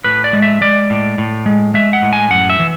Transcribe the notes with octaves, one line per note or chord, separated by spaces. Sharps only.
A2 B4
D5
G#3
E5
G#3 D5
A2
A2
G#3
G#3 E5
F#5
A2
G#5
F#2 F#5
E5
E3